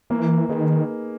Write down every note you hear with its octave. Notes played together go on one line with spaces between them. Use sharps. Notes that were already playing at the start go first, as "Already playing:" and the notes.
E3 A#3
D#3 D#4 G#4 B4